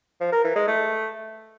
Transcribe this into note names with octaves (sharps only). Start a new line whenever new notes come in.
F3
A#4
E3
G#3
A3